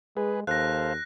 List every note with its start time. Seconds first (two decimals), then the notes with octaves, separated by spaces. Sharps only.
0.17 G#3 G#4 B4
0.47 D#2 A4 C5 F5 F#6 A#6